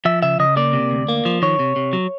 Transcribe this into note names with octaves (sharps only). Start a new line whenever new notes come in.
F3 E5
C#3 E5
C#3 D#5
A#3 D5
C3
D2
A#3
F3
D#3 C#5
C3
C3
F#3